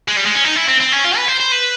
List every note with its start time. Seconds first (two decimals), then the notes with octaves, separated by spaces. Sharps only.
0.08 G#3
0.17 G3
0.26 G#3
0.35 C#4
0.45 D#4
0.56 E4
0.68 C4
0.80 C4
0.92 C#4
1.04 F4
1.17 B4
1.28 C5
1.40 C5
1.52 B4